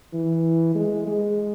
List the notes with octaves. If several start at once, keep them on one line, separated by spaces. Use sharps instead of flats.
E3
G#3
G#3